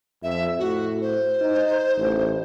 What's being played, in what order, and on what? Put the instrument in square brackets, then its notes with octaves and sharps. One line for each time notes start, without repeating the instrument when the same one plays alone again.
[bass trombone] F2 [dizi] E5
[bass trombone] A2 [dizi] F#4
[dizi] C5
[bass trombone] D#4
A1